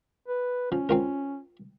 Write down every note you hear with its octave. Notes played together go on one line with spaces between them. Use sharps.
B4
F3 C#4
C4 F4 A#4